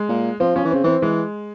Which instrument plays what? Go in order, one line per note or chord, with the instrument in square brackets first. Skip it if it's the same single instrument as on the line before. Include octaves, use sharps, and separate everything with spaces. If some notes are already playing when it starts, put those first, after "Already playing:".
Already playing: [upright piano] G#3
[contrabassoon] A#2
[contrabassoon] F3 [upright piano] C4
[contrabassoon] F3 [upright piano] C#4
[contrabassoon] E3
[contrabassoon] C#3 [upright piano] C4
[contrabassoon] E3 [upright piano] C4
[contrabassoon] E3 [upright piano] G#3